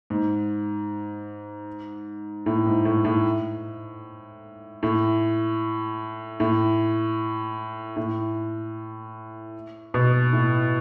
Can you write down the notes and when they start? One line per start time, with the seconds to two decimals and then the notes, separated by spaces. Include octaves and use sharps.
0.10 G#2
2.46 A2
2.66 G#2
2.85 A2
3.05 A2
4.83 A2
6.40 A2
7.96 A2
9.94 B2
10.33 A2